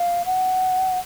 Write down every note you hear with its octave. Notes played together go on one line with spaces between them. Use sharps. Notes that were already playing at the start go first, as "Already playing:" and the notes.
Already playing: F5
F#5